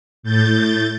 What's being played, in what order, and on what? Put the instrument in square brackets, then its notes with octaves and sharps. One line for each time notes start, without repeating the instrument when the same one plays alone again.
[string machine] A2 G6 A6